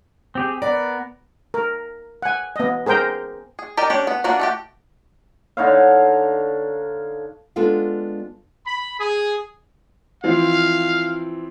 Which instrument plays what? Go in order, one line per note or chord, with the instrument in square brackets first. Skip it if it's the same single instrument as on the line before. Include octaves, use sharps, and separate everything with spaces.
[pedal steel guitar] C4 G4 G#4
[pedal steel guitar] B3 A#4 [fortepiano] D5
[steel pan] A#4
F#5 G#5
B3 D#5
G#4 A#4 C5 G5 A#5
[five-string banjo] G#4
G4 A#4 D5 D#5
C#4 D4 G4 C#5
B3
A#3 D4 F4 F#4 B4
A3 F#4 G4
[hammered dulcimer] D3 D#4 C#5 F5
[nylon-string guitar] G#3 B3 D4 F4 A4 F5
[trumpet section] B5
G#4
[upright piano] E3 F3 C4 [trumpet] F5